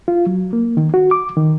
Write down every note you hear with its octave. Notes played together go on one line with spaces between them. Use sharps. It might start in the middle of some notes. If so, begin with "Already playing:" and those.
F4
F#3
A#3
D#3
F#4
D6
D#3